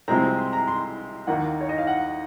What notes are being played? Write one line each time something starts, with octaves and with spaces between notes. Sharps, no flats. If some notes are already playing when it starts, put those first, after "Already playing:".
C2 C3 F3 G#3 C4 A#5
C6
A#5
C6
D#2 D#3 A#3 F#5
C#5
D#5
F5
F#5